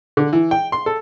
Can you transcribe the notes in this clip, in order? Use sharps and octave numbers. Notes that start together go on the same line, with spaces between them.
D3
E3
G5
C6
A4